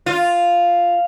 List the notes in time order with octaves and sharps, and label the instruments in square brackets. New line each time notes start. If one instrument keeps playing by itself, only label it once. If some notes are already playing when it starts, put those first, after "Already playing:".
[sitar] F4